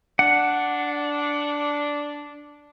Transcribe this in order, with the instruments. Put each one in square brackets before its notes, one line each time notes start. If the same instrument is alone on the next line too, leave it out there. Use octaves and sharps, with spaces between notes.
[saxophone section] D4 [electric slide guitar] F#5